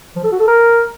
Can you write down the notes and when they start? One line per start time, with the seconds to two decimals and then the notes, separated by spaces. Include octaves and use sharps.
0.16 F3
0.24 A4
0.32 F#4
0.40 A4
0.48 A#4